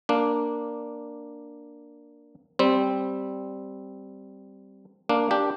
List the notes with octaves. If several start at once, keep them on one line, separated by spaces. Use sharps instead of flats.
A#3 D4
G3 C4
A#3 D4
D4 G4